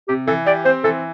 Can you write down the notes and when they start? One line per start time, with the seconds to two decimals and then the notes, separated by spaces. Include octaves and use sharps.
0.08 C3 G4
0.27 E3 A4
0.46 G4 D5
0.65 C4 C5
0.84 E3 A4